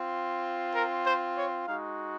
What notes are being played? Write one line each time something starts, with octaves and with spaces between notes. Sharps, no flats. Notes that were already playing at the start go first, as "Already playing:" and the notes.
Already playing: C4 F4
A#4
C5
C#5
G#3 D#4 F#4 F5